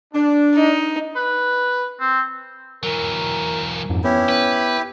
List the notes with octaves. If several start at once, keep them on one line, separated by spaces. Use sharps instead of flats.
D4
D#4
B4
C4
E3 F#3 A#4
F2 G#2
B3 C#4 E4 G4
B4